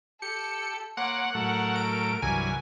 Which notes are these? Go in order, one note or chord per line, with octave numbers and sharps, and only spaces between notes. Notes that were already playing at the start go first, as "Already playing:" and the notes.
G4 A4 C#7
A#3 C#5 F#5 C6 D6
A2 F#3 A3 A#4
D7
C2 G2 E3 F#3 G#5